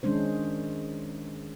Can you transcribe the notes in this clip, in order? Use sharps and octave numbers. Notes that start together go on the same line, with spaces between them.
D#3 G#3 C#4 D4 C5